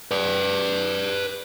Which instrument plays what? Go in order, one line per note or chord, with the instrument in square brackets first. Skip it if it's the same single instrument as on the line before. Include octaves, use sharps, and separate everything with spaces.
[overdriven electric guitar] B4 D5